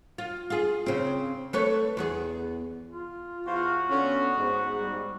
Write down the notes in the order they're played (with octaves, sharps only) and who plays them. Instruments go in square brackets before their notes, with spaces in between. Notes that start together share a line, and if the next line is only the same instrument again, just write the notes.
[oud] F4
F4 G#4
C#3 C4
A3 B4 C#5
E2 B3 G#4
[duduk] F4
[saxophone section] E2 C5 F5 [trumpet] F#4
[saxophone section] D3 C#4 [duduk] B3
[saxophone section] G#2
[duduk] G3